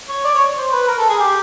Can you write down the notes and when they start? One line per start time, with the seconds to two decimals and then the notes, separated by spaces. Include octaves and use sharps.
0.09 C#5
0.24 D5
0.34 C#5
0.56 C5
0.72 B4
0.87 A#4
0.98 A4
1.09 G#4
1.20 G4